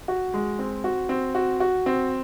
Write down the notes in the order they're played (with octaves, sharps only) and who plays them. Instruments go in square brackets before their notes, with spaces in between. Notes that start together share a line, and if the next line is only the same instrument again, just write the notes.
[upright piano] F#4
G#3
C4
F#4
C4
F#4
F#4
C4